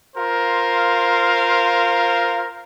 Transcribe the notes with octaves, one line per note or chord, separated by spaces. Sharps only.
F4 A#4 C5 F5